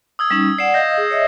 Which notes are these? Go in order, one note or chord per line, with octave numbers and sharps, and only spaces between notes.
D#6 E6 G#6
G3 C#4 D#4
D5 F#5 C7 E7
D#5 F5 G6 A#6
G#4
C#5 D#5 E5